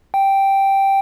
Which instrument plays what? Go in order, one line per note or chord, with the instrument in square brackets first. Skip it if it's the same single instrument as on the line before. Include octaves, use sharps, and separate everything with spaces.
[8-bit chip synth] G5